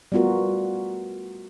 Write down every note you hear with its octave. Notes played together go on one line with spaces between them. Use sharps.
G3 A3 B3 F4 F#4 A#4